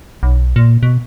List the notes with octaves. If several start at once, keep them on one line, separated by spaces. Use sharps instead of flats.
B1
A#2
B2